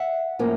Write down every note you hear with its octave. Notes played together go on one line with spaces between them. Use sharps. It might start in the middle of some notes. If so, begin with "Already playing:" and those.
Already playing: E5 F#5
A2 F3 A#3 C#4